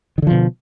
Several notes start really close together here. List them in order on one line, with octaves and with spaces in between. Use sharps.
D#3 D3 F3 B2